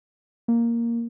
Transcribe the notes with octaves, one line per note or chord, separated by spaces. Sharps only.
A#3